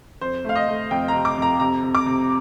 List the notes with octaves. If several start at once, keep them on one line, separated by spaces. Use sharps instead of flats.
F2 C5
A3 F5
D#5
A3
F2 G5
A#5
C3
D6
F2 A#5
C3 A#5
C3
D6
C3